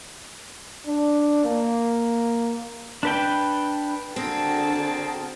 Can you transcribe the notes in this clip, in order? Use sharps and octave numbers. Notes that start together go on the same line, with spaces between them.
D4
A#3
D4 B4 G5
D3 C4 F#4 G#4 A#4 G5 A5